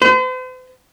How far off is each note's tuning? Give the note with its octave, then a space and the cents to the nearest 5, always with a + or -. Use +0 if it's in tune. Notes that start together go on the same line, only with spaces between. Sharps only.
C5 -45